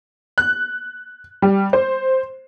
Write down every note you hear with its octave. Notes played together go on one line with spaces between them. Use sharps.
F#6
G3
C5